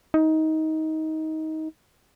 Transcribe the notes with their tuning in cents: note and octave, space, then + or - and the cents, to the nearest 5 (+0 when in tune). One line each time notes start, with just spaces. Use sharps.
D#4 +20